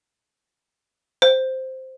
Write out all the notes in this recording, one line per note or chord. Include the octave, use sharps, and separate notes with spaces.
C5